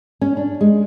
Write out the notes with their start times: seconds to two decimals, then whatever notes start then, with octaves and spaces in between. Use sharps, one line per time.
0.21 C#4
0.37 D4
0.61 G#3